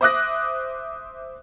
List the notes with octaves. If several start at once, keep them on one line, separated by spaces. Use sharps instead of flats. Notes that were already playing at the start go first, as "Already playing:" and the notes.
C5 E5 D6 D#6 F#6 A#6